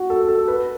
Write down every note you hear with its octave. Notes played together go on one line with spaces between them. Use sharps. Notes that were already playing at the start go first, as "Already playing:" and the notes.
Already playing: F#4
A4
A4
B4